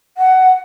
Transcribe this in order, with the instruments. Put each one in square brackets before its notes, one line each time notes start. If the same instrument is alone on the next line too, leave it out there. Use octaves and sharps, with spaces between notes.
[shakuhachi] F#5